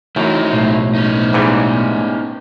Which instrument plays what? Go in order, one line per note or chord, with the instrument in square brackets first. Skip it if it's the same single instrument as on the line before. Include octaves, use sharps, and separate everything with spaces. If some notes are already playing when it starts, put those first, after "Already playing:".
[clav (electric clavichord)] F#2 [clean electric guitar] E3 [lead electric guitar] A3 D#4
[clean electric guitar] B1 A2
[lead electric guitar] C#4 D#4
[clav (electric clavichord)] G#2 E3 G3